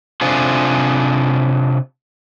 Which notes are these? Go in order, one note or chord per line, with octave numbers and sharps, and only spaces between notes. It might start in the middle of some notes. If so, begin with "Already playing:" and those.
C3 D4 F4 G#4 A4 C5